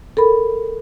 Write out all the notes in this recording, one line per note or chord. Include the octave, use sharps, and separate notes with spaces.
A4 A#4 B5